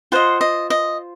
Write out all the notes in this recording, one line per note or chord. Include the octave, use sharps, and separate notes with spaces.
F4 C5 D#5 F#5
D#5
D#5